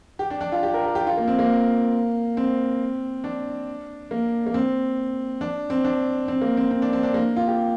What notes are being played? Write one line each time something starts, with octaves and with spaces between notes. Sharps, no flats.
G4
D4
D4
F4
G4
A#4
G4
G4
F4
A#3
C4
A#3
C4
D4
A#3
A#3
C4
D4
C4
D4
C4
A#3
C4
C4
D4
C4
D4
A#3
F4
G4